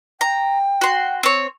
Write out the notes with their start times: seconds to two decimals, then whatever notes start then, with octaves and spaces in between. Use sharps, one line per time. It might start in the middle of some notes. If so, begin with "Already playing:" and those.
0.21 G5 A#5
0.81 F#4 C6
1.23 C4 C#5